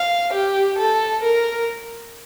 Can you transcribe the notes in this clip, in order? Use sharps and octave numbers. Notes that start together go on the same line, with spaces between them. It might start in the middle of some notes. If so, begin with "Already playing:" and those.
Already playing: F5
G4
A4
A#4